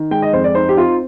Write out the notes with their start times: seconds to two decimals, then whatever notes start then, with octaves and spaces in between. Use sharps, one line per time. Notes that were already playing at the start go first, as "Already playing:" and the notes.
Already playing: D#3
0.11 G#3 G5
0.22 D#5
0.33 F2 C5
0.44 D5
0.55 D#4 C5
0.69 G4
0.77 C4 F4